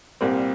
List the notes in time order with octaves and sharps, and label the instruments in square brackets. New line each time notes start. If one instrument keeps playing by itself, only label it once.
[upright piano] C2 A#2 G3 C4